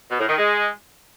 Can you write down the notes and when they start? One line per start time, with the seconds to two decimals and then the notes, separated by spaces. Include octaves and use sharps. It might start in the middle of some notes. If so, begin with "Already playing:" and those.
0.11 B2
0.20 A2
0.29 D#3
0.38 G#3